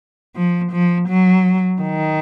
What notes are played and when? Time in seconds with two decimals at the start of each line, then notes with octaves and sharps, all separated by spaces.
0.36 F3
0.72 F3
1.09 F#3
1.82 D#3